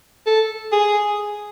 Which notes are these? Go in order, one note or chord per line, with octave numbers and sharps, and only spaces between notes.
A4
G#4